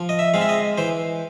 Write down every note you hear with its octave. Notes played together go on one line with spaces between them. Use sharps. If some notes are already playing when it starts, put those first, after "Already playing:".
Already playing: F3
D#5
E5
G#3 C4 F5
E5
D#5
E3 C5